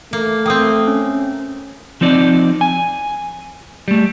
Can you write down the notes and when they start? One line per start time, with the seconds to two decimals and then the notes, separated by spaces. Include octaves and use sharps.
0.13 A3 A#3
0.46 A#3 C4 G5 D#6
0.88 C#4
2.01 F3 C4 D#4 D5
2.61 G#5
3.88 G3 A3